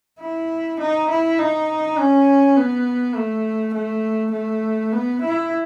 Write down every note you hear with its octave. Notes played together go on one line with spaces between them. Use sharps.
E4
D#4
E4
D#4
C#4
B3
A3
A3
A3
B3
E4